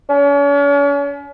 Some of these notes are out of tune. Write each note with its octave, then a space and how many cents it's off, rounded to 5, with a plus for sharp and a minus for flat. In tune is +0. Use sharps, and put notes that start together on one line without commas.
C#4 +40